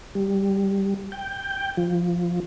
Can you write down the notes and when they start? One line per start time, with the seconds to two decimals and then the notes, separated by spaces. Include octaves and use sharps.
0.15 G3
1.12 G5
1.77 F3